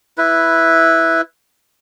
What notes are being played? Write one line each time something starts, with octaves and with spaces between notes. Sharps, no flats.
E4 B4